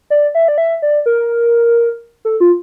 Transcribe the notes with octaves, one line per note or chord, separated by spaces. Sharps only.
D5
E5
D5
E5
D5
A#4
A4
F4